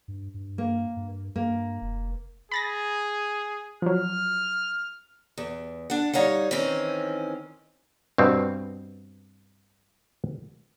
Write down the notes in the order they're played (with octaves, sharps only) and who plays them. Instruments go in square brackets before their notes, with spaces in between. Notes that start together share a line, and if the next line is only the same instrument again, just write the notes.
[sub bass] G2
G2
[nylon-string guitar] A#3
[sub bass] G2
[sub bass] G2 [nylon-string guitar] A#3
[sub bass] F1
[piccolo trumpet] G#4 [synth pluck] B5 A6 A#6
[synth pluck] F3 F#3 [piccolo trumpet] F6
[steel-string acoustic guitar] E2
D4 F#5
G3 D#4 C#5 F5 F#5
D#3 E3 C4 C#4
[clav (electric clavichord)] G2 B2 C4